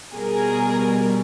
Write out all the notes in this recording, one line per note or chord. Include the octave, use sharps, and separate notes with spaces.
B2 G3 G#4 A#4